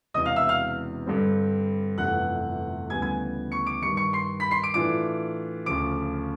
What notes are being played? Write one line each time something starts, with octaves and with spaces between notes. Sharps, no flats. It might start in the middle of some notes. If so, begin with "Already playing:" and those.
E1 E2 C3 D#5 D#6
F5 F6
E5 E6
F5 F6
G2 D3 G3 C4
G1 F2 C3 E3 A3 F#5 F#6
D2 C#3 E3 G3 B3 G#5 G#6
G#5 G#6
C#6 C#7
D6 D7
G2 D#3 G3 C#6 C#7
C#6 C#7
C6 C7
B5 B6
C6 C7
D6 D7
A2 E3 A3 D4 F4 D6 D7
D2 C#3 F3 D6 D7